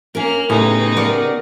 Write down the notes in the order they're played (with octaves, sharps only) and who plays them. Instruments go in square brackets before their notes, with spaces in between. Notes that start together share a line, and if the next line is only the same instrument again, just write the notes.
[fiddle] A#3 F6 [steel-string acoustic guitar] C#4 A#4
[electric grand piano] A2 [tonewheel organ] C#3 B3 G4 [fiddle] D#4 G#4 [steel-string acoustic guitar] G#5
[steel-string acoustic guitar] A#4 D5 F#5